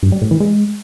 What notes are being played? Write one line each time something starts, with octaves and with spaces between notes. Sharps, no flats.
G2
G3
A2
E3
G#3